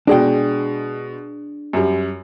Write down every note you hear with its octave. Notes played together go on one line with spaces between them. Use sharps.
B2 G#3 D4 G#4 G5
F#2 G3